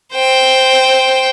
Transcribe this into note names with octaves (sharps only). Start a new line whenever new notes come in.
C5 G5